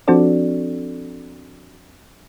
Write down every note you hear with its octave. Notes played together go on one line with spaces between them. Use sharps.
F3 C4 D4 F#4 A4 D5